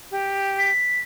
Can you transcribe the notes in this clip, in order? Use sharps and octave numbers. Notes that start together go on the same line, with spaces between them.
G4
B6